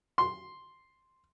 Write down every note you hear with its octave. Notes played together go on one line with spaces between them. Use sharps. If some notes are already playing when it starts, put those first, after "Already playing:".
C6